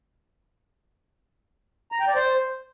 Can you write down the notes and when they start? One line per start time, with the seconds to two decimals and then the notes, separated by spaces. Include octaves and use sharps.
1.92 A#5
2.00 G5
2.08 D5
2.15 C5